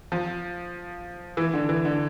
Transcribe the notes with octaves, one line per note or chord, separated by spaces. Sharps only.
F3
E3
D3
E3
D3